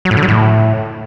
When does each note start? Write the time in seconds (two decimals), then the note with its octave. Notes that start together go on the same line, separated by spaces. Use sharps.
0.05 F#3
0.11 A2
0.17 D3
0.23 F#3
0.28 A2